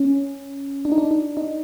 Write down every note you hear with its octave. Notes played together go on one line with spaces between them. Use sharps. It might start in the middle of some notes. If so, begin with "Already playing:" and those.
Already playing: C#4
D4
D#4
D4
D#4
D#4